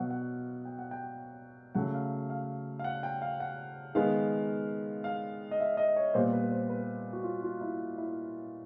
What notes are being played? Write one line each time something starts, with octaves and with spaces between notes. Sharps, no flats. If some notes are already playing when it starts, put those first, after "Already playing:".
Already playing: B2 F#3 B3 F5 F#5
F#5
G5
F#5
G5
C#3 F#3 A3 F#5
F5
F5
F5
F#5
G5
F5
F#5
D#3 G#3 B3 F5
F5
D#5
E5
D#5
C#5
A#2 G3 B3 C5
B4
C5
B4
F#4
F4
F4
E4
E4